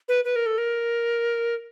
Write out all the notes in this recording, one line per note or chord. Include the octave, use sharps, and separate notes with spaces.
B4
B4
A#4
A4
A#4